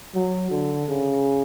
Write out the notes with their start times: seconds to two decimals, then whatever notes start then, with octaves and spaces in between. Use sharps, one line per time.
0.14 F#3
0.51 D3
0.89 C#3